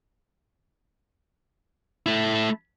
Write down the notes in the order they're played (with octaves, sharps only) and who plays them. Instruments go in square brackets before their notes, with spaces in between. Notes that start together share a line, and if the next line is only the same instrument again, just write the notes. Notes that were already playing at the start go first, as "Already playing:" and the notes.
[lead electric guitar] A3 E4